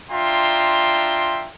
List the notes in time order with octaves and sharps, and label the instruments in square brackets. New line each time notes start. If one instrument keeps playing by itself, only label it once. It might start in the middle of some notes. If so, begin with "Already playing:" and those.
[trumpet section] D4 F4 E5 G5 A#5 C6